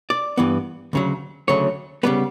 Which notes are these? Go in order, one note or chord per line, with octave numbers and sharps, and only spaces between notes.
D5
G2 E3 B3
D2 C#3 F#3
D2 C#3 F#3 A3 C#5
C#3 G3 B3 B4